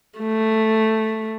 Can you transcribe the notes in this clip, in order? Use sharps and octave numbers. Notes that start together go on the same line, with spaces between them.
A3